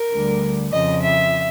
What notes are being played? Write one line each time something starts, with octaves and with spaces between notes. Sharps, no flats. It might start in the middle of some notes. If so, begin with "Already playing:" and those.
Already playing: A#4
D2 D3 G3
F2 C#3 F3 D#5
E5